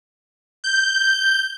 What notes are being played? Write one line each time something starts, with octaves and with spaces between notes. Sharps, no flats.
G6